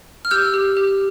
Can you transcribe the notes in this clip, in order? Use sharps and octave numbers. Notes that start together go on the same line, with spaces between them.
F6
G4 E6 G6
G4
G4